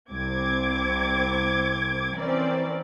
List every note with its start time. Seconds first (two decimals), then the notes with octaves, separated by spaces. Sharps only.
0.11 C2 C4 D6 G#6
2.15 E3 C4 C#4 A#4 D5